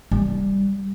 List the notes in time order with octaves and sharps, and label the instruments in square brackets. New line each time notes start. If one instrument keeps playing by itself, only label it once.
[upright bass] G3